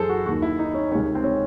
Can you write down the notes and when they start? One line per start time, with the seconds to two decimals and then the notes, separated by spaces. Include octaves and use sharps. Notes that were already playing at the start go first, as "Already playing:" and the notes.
Already playing: F#2 E3 G#4 A4 C5
0.09 F#4
0.26 D#2 D#3 F#4
0.42 E4
0.59 D#4
0.74 C#4
0.91 C#2 C3 D#3 C#4
1.15 C4
1.24 C#4